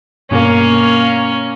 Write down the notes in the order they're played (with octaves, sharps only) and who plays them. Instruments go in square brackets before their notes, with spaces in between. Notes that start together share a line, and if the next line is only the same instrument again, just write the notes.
[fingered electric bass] G2 B2 [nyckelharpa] A#3 [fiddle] C#4